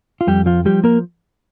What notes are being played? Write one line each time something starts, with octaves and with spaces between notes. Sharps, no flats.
F4
F2 G3 G4
F3 F4
F3 G3 G4
A#3 A#4